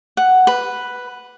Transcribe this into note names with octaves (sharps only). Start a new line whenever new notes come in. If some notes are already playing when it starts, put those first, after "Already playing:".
F#5
B4